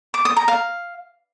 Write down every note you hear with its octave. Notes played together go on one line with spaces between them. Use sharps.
D6
D#6
A#5
F5